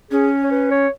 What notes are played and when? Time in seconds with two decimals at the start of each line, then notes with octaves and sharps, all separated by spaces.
0.11 C#4 G#4
0.44 C#5
0.51 B4
0.71 C#5